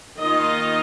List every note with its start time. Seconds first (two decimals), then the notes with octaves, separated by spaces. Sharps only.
0.20 D#3 A#3 F4 D#5